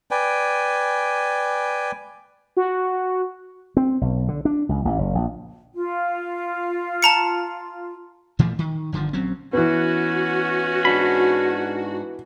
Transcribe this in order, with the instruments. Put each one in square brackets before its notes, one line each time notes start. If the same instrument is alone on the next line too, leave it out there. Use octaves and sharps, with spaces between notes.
[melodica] B4 D5 G5 G#5
[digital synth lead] F#4
[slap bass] C4
B1
D3
D4
C#2
A1
F#1
A#1
[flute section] F4
[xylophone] A5 A#5 C#7
[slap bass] A#2 E3 F3 A3
D#3
G1 D3 D#3 F3
A#1 F#3 C4 C#4
[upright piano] E3 B3 [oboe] C#4 [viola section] F#4
[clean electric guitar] G#2 D4 B5